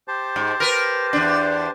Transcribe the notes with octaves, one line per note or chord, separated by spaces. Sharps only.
G4 C5 A5
G#2
A#4 B4
E2 D4